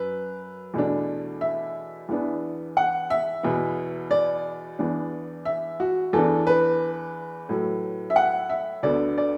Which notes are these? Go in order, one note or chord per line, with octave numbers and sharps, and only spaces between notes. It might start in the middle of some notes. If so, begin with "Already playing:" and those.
Already playing: F#2 B4
E2 B2 A3 D4
E5
E2 E3 B3 D4
F#5
E5
E2 B2 B3
D5
E2 E3 B3 D4
E5
F#4
E2 E3 B3 D4 A4
B4
A2 F#3 A3
E5
F#5
E5
D2 D3 B3 D5
D5